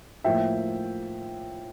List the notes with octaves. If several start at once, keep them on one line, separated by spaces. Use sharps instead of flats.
A2 F3 A#3 E5 G5